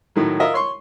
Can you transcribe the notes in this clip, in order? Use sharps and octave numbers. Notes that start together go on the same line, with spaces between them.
A2 D#3 F#3
F4 A#4 D#5 E5
C#5 C6 C#6